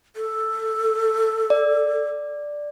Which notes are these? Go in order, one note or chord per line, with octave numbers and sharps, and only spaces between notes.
A4
D5